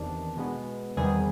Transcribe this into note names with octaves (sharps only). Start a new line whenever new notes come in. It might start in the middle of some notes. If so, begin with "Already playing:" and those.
Already playing: E2 C3 D#3 D4
B2 G#3 B3
E2 C3 D#3 G3 B3 G#4